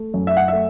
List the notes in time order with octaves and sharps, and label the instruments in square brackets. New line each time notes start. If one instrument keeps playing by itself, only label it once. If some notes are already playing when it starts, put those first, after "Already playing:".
Already playing: [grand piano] A3
F#2
E5
F#5
A3 E5